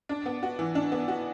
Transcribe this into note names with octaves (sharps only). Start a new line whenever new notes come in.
D4
B3
F#4
E3
D4
B3
F#4